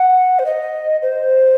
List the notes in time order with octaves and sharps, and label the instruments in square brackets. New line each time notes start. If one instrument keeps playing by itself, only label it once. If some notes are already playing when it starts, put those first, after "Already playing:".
Already playing: [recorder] F#5
C5
D#5
C5